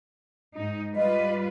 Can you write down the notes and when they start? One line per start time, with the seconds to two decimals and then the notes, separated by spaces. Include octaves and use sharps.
0.57 G#2 D#4
0.96 G3 F4 B4 D#5